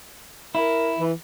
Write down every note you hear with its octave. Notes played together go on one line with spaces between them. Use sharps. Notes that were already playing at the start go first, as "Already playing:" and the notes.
E4 A#4
E3